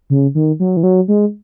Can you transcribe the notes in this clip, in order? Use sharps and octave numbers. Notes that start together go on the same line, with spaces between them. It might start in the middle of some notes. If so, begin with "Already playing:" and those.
C#3
D#3
F#3
E3
F#3
G#3